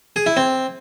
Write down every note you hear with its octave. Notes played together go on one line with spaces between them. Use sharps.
G#4
E4
C4